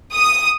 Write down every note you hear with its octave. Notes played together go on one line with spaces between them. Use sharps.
D#6